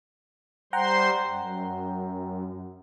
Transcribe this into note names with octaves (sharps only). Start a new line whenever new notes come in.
G3 C5 F#5 G5 A#5 C6
F#2